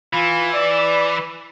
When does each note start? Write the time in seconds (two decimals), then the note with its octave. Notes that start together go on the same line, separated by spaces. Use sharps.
0.13 E3 F4
0.54 D5